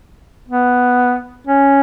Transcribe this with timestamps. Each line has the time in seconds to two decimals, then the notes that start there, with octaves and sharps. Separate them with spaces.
0.48 B3
1.47 C#4